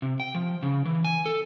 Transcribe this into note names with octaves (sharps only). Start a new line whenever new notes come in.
C3
G5
F3
C#3
E3
G#5
A4